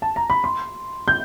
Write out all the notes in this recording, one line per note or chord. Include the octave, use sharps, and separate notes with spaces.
A5
A#5
B5
C6
G6